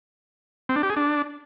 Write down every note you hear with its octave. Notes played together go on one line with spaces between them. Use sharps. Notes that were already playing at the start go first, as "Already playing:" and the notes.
C4
D4
G4
G#4
D4